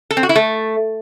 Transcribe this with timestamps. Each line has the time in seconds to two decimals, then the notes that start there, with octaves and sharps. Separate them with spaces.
0.11 A4
0.17 C4
0.23 F#4
0.29 E4
0.36 A3